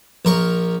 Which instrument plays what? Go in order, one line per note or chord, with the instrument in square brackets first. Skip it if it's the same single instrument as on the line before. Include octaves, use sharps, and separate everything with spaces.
[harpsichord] A#1 A#4 C#6